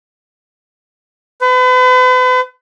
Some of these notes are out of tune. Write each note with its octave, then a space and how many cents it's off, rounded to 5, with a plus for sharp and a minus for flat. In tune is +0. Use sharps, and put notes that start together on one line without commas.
B4 +40